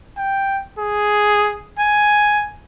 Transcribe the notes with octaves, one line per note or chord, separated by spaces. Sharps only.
G5
G#4
G#5